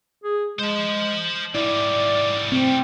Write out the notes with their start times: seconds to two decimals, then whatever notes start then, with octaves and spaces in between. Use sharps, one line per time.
0.24 G#4
0.59 G#3 C5 A5
1.55 G#2 G3 E4 D5
2.52 G3 A3 C4